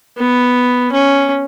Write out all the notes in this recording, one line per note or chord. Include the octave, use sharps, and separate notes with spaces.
B3
C#4